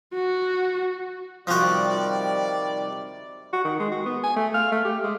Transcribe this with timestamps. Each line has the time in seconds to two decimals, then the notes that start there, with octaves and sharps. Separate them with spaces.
0.13 F#4
1.47 C3 D#3 F3 G3 F#4 D5
3.53 F#4
3.65 D#3
3.80 G#3
3.92 F#4
4.06 B3
4.24 G#5
4.36 A3
4.54 F5
4.72 A3
4.85 G4
5.03 G#3